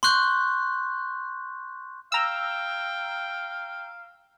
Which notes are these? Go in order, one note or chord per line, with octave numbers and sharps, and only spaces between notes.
C6 C#6 F#6 G6
F5 G5 A#5 E6